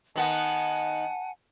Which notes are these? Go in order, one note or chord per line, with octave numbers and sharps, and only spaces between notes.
D#3 B3 F#5 G#5 A5